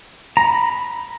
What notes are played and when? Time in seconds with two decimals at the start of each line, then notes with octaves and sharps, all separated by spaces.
0.37 A#5
0.45 B5